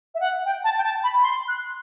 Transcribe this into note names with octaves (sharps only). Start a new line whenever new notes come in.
E5
F#5
G5
A5
G5
A5
B5
C6
F#6